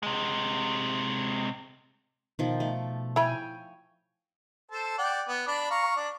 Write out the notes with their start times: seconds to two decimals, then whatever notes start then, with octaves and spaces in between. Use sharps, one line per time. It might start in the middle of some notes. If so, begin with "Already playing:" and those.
0.03 C3 G#3
2.39 B2 D#3 F3
2.60 A3
3.16 E4 C#5 G5 G#5 B5
4.71 A4 C5 A5
4.98 D5 F#5 G5
5.28 B3
5.47 D4 D5 B5
5.71 F5 A#5 C#6
5.96 D4 D5